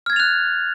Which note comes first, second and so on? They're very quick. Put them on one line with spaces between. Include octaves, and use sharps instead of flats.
F6 G#6 A6 F7 F#6